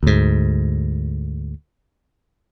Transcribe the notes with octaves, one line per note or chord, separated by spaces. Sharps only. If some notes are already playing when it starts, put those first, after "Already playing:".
D2 G#2